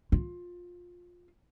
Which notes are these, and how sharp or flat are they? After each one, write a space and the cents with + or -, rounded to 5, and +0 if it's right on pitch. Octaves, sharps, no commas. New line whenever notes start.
F4 +15